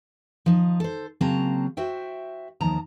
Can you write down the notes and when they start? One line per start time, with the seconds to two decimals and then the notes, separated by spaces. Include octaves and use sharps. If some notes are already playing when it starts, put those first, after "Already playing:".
0.46 F3 D#4
0.80 A4 C5
1.21 C#3 F#3 A#3 C4 A5 A#5
1.77 F#4 C5 E5 G5
2.61 D#2 D#3 F3 A5 A#5